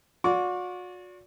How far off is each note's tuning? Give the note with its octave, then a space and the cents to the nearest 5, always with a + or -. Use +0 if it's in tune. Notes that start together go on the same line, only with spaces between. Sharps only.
F#4 -40 D5 -30 D6 -40